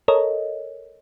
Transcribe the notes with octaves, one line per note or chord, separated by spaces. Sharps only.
A4 A#4 C#5 D#5